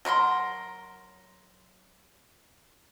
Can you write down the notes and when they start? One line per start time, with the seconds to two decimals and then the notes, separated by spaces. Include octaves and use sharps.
0.05 F#3 A#4 B5 C6